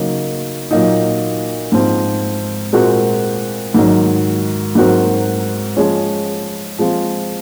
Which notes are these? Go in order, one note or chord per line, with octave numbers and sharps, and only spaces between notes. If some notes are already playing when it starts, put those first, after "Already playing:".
Already playing: C#3 F#3 A#3 D#4
A#2 F#3 A#3 D#4
G#2 F3 C4
A#2 G#3 C4 F#4 A#4
G#2 D#3 F#3
G#2 F#3 C4 F#4 A#4
F3 G#3 C#4
F3 G#3 C4 F4